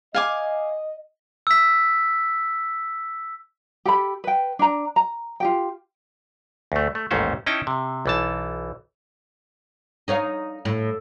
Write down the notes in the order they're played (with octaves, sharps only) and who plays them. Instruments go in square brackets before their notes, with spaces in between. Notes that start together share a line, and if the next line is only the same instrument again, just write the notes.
[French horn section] D#5 [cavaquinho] F5 G#5 D6
[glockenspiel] E6 B6
[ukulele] G4 A4 B5
B4 G5
D4 A#5
A#5
F4 G4 G5
[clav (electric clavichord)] D2 A3
A3
A1 D#2 G#2 A3 C#4 C5
C#4 D#4 E4 G5 A5
C3
B1 E3 A5
[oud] D#4 C#5 F5
A2